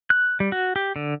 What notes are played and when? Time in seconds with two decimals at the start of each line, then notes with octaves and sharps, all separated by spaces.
0.10 F#6
0.40 G3
0.52 F#4
0.76 G4
0.96 D3